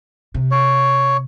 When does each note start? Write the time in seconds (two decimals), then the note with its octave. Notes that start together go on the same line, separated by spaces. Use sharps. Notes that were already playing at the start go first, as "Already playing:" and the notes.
0.34 C3
0.51 C#5